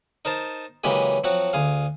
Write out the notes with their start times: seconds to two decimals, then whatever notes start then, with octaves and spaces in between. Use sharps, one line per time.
0.25 D#4 A#4 C5 A5
0.84 C#3 E3 F#3 G#3 A#3 G4
1.24 F3 F#3 C4 F#4
1.53 D2 G#4 F5